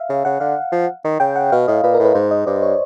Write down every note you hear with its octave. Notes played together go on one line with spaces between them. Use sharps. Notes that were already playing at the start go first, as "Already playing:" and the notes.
Already playing: E5 F5
C#3
C#3 F#5
D3 F5
F3
D#3
C#3 G5
F#5
B2 F5
A2 D#5
A#2 B4
A#4
A2
B4
G#2 C5
D#5
G2 D5
C#5